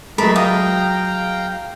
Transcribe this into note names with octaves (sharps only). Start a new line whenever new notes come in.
F#3 G#3 A3 A#4 A5 B5
F5 G5 A#5 D#6